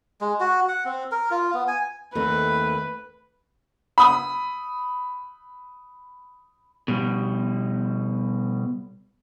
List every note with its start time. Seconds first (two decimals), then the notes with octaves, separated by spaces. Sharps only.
0.21 G#3
0.40 F#4
0.68 F#5
0.85 C4
1.11 A#4
1.31 F4
1.54 B3
1.68 G#5
2.15 D#2 A3 C4 B4
3.98 B5 D#6
6.88 B2 G3